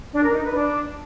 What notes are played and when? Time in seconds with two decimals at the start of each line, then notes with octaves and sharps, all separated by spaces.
0.13 D4
0.23 A#4
0.34 D#4
0.44 B4
0.54 D4